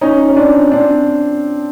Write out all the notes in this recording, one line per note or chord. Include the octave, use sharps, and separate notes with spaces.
C#4 D#4
C#4
C4 D4
C4 D4